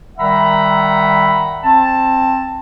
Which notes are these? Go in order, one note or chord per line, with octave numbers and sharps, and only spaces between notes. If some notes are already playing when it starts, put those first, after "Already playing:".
D#3 G3 E5 F#5 A#5 B5
C4 A5